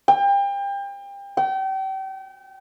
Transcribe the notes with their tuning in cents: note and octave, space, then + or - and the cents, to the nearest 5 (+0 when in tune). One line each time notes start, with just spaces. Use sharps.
G5 +30
G5 -35